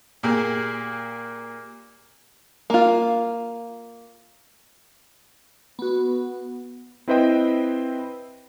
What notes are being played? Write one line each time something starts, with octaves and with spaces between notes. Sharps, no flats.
A#2 A#3 G4 G#4
A#3 F4
B3 F#4
C4 E4 B4 C5 D#5 G5